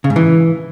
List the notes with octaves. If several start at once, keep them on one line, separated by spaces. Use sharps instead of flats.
C#3
G#2
E3